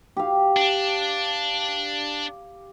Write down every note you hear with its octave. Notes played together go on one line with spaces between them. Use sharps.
G4 F5
D4